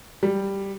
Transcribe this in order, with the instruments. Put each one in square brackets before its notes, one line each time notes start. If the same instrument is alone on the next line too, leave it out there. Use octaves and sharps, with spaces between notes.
[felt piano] G3